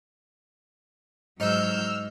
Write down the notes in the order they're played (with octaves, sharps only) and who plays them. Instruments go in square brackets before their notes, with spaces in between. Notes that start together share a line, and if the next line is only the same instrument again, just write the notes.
[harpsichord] G#2 D#4 [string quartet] F#3 G6 [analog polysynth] E6 F6